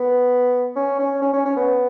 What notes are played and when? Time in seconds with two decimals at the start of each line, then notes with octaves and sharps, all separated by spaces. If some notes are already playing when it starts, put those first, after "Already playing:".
Already playing: B3
0.76 C#4
0.99 C#4
1.22 C#4
1.33 C#4
1.45 C#4
1.56 B3